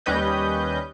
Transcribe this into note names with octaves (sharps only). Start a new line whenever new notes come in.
D#2 G3 C#4 B4 D#5 G6